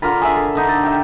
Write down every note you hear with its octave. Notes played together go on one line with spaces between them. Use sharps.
D3 F4 A#4 B5
G#4 E5
A4
D3 D#4
A4
G4 E5